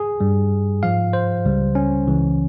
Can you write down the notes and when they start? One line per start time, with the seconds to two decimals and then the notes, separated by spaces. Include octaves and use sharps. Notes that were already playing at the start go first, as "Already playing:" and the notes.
Already playing: G#4
0.20 G2 G3
0.83 G#2 F3 F5
1.13 C5
1.45 C#2 C#3 G3
1.75 C#4
2.07 C#2 C#3 E3